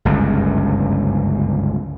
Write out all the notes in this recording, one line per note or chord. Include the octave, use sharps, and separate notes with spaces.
G1 C#2 F#2